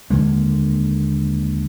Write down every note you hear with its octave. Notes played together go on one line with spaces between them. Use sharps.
D#2 D3 G#3 A#3